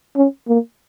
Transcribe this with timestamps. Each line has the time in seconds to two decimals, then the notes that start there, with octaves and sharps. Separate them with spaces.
0.17 C#4
0.48 A#3